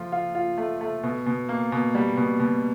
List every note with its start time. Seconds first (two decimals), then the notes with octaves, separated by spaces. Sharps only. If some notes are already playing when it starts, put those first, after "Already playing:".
Already playing: F3 A3 F4
0.12 F4
0.35 F4
0.58 A3
0.81 A3
1.03 B2
1.26 B2
1.49 A#3
1.72 B2
1.95 G3
2.17 B2
2.40 B2